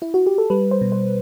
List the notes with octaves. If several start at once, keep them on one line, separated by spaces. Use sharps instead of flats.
E4
F#4
G4
A4
G3 B4
C5
B2
C5